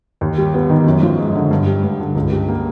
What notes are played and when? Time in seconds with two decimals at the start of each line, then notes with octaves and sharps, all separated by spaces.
0.21 D#2
0.38 G3
0.54 B3
0.70 D#3
0.87 F#2
1.02 F3
1.19 G#3
1.35 D3
1.51 G2
1.66 G3
1.84 G2
2.00 D3
2.15 C#2
2.32 G3
2.48 A#3